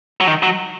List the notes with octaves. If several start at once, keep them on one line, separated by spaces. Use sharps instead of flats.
F#3
D#3
F#3